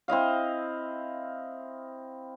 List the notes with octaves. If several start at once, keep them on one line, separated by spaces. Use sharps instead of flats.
C4 E4 D#5 F5